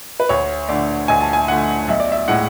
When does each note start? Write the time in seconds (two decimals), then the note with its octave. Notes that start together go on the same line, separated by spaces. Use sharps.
0.20 B4
0.29 D2 C#5
0.69 D3 A3 D5
1.08 D2 G#5
1.21 A5
1.33 G#5
1.48 D3 A3 F#5
1.88 B1 E5
2.00 D5
2.12 E5
2.28 A2 G#3 F#5